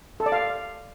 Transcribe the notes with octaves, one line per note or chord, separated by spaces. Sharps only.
A4
D5
F5